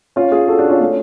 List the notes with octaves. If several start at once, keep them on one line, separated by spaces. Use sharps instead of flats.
C#4 F4
F4 G#4
F#4 A4
D4 F#4
C#4 F4
A3 C#4